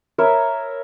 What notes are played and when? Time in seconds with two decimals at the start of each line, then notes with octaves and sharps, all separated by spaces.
0.18 A#4 C#5 E5 B5